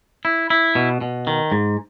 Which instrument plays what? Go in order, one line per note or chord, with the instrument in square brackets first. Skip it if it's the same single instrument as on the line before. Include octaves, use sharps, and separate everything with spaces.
[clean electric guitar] E4
E4
B2
B2
D#3
G#2